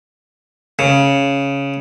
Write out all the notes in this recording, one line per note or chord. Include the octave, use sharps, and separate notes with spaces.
C#3